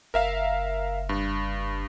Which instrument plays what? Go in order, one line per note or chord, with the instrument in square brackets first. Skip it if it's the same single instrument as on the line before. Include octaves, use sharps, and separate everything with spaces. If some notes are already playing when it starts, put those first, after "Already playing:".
[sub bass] F#1 [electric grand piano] A#4 E5 F5
[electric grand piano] G2